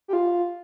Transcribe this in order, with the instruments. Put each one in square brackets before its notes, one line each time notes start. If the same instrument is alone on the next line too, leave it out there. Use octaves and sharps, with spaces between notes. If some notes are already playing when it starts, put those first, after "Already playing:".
[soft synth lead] G4
F4